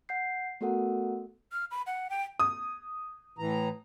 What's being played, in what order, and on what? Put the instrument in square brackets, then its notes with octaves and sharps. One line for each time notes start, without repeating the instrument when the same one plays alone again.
[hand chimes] F#5 G6 C7
A3 B3 F#4 A4 A#4 F#5
[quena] F6
B5
F#5
G5
[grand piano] D#6
[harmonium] A2 E3 A#5